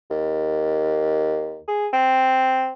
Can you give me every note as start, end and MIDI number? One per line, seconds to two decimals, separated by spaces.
0.10 1.60 39
1.68 1.87 68
1.93 2.72 60